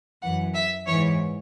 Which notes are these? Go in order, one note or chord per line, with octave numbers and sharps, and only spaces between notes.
F#2 E3 F#5
E5
G#2 E3 C#5